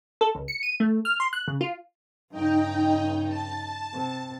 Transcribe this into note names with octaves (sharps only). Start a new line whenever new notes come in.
A4
C#2
C#7
D#7
A3
F6
C6
F#6
C#3
F4
G2 C#3 D#4 G5
A5
C3